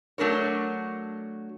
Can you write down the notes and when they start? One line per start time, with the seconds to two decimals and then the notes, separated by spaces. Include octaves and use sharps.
0.18 F#3 A3 D4 A#4 C#5